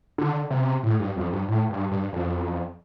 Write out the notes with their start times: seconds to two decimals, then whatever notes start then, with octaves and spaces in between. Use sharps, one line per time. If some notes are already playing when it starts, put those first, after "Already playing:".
0.18 D3
0.50 C3
0.83 A2
0.99 G2
1.16 F2
1.33 G2
1.48 A2
1.70 G2
1.91 G2
2.13 F2